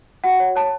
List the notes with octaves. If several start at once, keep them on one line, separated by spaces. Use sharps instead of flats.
F#4 F#5
C#5
C#5 A5